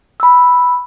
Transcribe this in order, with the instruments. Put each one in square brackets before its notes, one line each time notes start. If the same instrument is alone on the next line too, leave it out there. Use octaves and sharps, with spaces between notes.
[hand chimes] B5 E6